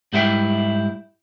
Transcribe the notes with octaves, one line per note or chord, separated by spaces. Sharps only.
G#2 G3 E4 G4 E5 G5